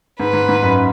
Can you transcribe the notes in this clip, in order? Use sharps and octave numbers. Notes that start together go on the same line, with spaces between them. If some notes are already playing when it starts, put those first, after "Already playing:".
G#2 B4
G#2
G#2
F#2